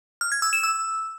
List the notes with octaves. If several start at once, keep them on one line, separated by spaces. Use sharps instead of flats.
F6
G#6
E6
E7
E6